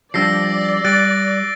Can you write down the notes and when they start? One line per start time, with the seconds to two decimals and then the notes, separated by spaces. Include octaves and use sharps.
0.14 F3 G3 D4 D5 E6 A#6 C7
0.85 G3 F#6 A6 D7